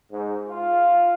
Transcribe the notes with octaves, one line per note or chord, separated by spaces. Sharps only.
G#2
F4